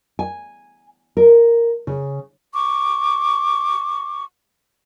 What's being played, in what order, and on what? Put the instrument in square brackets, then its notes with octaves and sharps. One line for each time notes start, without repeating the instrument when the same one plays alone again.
[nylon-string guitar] G#5
A#4
C#3
[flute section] C#6 D6